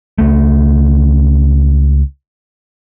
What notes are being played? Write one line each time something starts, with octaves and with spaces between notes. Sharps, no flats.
C#2 A3